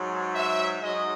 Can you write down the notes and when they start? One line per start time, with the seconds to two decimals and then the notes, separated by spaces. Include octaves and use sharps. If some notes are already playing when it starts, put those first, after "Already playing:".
Already playing: G#2 F#3
0.35 E5
0.81 G#2 F#3 D#5